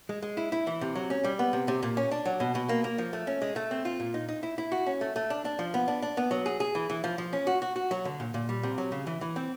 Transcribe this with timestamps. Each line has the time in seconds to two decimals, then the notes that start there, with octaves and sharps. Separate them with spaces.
0.09 G#3
0.23 G#3
0.37 E4
0.52 E4
0.67 E3
0.81 C3
0.95 F#3
1.10 C#4
1.24 G3
1.39 B3
1.53 C3
1.68 C3
1.83 A#2
1.97 C#4
2.11 D4
2.25 F#3
2.40 B2
2.55 B2
2.69 A#3
2.84 A#3
2.98 F3
3.13 A3
3.27 C#4
3.42 G#3
3.56 A3
3.71 C4
3.85 F4
4.00 A#2
4.14 D#4
4.29 D#4
4.43 E4
4.58 E4
4.72 F#4
4.86 C#4
5.01 A3
5.16 A3
5.30 D4
5.45 D4
5.59 F3
5.74 B3
5.88 D4
6.02 D4
6.17 B3
6.31 F#3
6.46 G#4
6.60 G#4
6.75 E3
6.90 E3
7.04 F3
7.18 F3
7.33 C#4
7.47 F#4
7.62 F#4
7.76 F#4
7.91 F#3
8.05 D3
8.20 A#2
8.34 A#2
8.49 G3
8.63 C3
8.78 F#3
8.92 C#3
9.07 E3
9.21 E3
9.36 C4